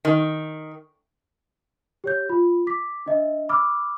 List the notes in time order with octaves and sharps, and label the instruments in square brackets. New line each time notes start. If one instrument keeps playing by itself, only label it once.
[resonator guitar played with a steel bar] D#3
[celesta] G4 C#5 G6
F4 B5
D6 B6
D4 D#5 E5
B5 D6 E6 F6